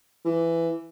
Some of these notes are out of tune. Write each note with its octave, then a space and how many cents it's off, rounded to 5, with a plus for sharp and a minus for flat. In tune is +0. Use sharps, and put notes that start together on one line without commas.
E3 +10